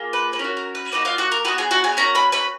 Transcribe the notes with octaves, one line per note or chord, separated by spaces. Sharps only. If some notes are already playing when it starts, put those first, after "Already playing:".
Already playing: A#3 F4 G#4
B4
B4
C#4 F#4 A#4
A#4
B4
A#3 D#4 F#4 B4
F4 F5
F#4 F#5
A#4
B3 F#4 B4
G#4 G#5
F#4 F#5
G#4 G#5
C#4 F#4 A#4 A#5
B4 B5
B4 B5